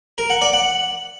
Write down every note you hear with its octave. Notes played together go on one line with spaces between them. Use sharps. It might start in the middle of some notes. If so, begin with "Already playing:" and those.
A#4
F#5
D5
F#5